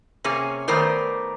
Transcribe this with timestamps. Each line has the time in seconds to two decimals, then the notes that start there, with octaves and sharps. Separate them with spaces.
0.24 C3 A#3 C#4 G#4
0.68 D#3 A3 B3 A#4 C5 D5